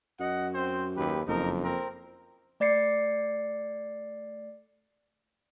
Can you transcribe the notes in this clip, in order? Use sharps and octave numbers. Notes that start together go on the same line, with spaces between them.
F#2 D#5 F#5
C4 C5
D#2 G4 B4
F#1 F2 D#4 A#4
C4 A#4
A3 D5 A6 C7 C#7